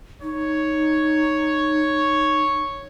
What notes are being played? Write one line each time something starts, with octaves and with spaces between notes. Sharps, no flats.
D#4 C#5